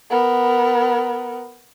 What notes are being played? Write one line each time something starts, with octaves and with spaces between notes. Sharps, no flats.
B3 A#4